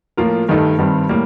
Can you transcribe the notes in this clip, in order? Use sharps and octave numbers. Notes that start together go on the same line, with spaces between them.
A2 F3 A#3 F4 A#4
G2 D#3 A3 D#4 A4
G2 D#3 G3 C4
A2 G3 A#3